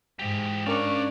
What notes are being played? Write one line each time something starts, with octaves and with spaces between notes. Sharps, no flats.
G#2 E3 G4
C#4 D4 A#4 D5 F5 C#6